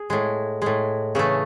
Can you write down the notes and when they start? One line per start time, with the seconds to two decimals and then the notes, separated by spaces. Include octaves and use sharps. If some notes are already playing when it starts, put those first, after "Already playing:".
Already playing: G#4
0.10 A2 G#3
0.62 A2 G#3
1.15 C#3 E3 A3